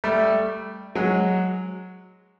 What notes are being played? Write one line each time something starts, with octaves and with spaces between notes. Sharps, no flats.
G3 A3
F#3 G#3